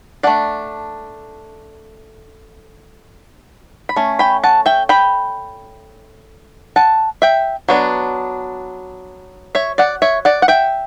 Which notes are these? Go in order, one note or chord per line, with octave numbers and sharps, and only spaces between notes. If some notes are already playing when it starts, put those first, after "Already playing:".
A3 D4 D5 F#5
B5
A3 C#4
G5 B5
F#5 A5
E5 G5
G5 B5
F#5 A5
E5 G5
F#3 B3 D4
C#5 E5
D5 F#5
C#5 E5
D5 F#5
F#5
E5 G5